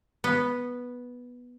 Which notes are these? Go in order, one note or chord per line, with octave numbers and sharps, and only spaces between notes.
B3